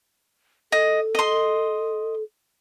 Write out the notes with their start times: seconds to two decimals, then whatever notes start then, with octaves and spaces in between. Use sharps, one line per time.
0.72 A4 D#5
1.15 D#5 C6